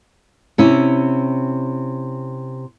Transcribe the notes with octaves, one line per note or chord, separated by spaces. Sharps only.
C3 C#4 E4